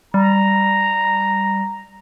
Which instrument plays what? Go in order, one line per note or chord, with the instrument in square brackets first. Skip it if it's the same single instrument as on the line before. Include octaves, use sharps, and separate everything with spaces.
[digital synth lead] G3 [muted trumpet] A#5